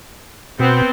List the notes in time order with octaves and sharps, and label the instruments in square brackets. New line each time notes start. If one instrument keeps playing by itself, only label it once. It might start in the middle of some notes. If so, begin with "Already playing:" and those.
[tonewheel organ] B2 [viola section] B3 C4